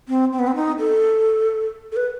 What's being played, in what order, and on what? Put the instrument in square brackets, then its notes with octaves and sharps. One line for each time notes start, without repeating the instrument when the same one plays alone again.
[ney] C4
C4
B3
C4
D#4
A4
A4
B4